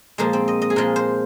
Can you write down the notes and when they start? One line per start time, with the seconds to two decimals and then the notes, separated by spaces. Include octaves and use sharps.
0.18 A#2 F3 G#3 A#3
0.33 C4
0.48 D#5
0.62 D#5
0.70 G#4
0.76 A#2 F3 G#3 A#4
0.96 C5